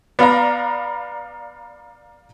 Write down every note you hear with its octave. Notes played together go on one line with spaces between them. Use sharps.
B3 D5 F5 A#5